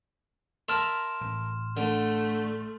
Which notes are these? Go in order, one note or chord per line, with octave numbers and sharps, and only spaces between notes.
A#4 E5 A5 C6 F6 E7
A1
D3 A3